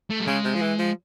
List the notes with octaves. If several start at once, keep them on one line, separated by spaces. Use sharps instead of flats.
A3
G3
C#3 G#3
C3
F3
E3
F3